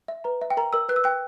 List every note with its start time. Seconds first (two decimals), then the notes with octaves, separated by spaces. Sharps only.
0.08 E5
0.24 B4 A#5
0.41 E5
0.50 G5
0.57 A#4 A#5
0.73 A#4 E6
0.89 B4 F#6
0.96 E6
1.04 G5 F#6